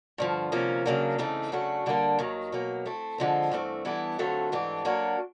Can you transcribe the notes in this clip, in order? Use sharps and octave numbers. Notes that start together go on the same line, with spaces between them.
G2 D3 F3
D2 C3 F3 A#3 C#4
C#3 F#3 A#3 D4
C#3 E3 A3 C4 D#4
C#3 F#3 A3 D4 F#4
D3 G3 A#3 D4
D#2 D#3 F#3
B2 F#3 A#3
A3 C4 E4
D3 F3 G#3 C4
G2 E3 A3 C4
E3 G3 B3 E4 A4
D3 F#3 A3 C4 F4
G#2 E3 A3 D4 G4
F#3 A#3 D4 F#4